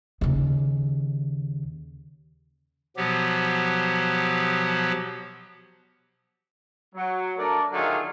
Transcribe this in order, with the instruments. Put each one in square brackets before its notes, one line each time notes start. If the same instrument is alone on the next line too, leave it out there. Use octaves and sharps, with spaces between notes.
[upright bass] D#2 C#3
[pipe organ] B2 F3 F#3 B3 G4
[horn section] F#3
A3 D4 A#4 D5
D3 D#3 F#3 A3 F4 G#4